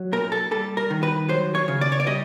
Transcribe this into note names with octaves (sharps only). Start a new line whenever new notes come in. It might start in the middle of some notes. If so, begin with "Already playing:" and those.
Already playing: F#3
A#2 A#4
A4
G3 A4
A#4
D#3
B4
F#3 C5
C#5
C#3
D5
C#5
D5
G3 D#5